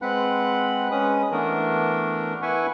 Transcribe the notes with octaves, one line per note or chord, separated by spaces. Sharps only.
G#3 C4 B4 F#5 B5 F#6
G#3 C#4 B4 D#6
E3 A3 B3 D4 A#4
E4 B4 E5 F#5 G#5 C#6